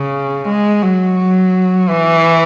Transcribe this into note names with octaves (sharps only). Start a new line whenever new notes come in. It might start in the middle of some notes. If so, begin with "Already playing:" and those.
Already playing: C#3
G#3
F#3
E3